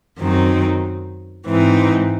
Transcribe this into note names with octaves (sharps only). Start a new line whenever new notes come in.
F#2 D#3 F#3 C4 D#4
G#2 E3 C4 D#4